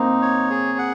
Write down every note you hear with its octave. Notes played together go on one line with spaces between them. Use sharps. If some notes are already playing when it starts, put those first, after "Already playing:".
Already playing: A#3 C4 D#4
C#5
G#4
F#5